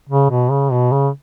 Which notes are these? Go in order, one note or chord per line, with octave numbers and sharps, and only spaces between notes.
C#3
B2
C#3
B2
C#3